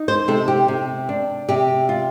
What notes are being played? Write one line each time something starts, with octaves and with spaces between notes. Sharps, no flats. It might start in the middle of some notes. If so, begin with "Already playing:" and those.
Already playing: D#4
C5
C3 A4
G4
C3
D4
C3 G4
F4